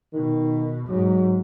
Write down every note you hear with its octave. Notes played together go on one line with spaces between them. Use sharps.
B2 D#3
G#2 F#3